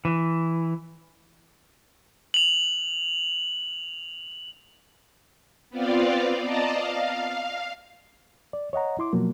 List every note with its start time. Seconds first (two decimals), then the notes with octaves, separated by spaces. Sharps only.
0.05 E3
2.34 F7 F#7
5.70 B3 C4 F4 D5 F5
6.42 D5 D#5 A5 A#5
6.71 F5
8.53 D5
8.73 C#5 D#5 F#5 A#5
8.99 E4 C6 D6
9.13 B2 F3 F#3 A#3